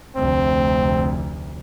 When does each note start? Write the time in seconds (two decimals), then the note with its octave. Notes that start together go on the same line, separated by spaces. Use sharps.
0.16 F1 D2 C4